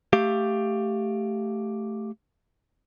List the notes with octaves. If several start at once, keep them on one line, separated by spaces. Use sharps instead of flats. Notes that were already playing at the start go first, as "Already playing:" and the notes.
A3 G4 F5